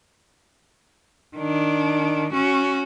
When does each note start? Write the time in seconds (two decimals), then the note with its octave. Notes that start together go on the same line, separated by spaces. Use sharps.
1.37 D#3 D4
2.33 C#4 F#4